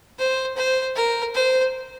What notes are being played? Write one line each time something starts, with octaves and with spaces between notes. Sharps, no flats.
C5
C5
A#4
C5